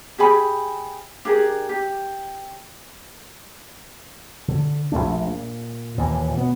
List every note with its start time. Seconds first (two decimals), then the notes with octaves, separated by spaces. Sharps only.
0.18 G4 G#4 G#5 B5
1.25 D4 G4 G#4 A#4
1.69 G4
4.48 D3
4.92 A#1 G#2 A3 D4
5.27 A#2
5.98 D#2 A#2 E3
6.34 B2 B3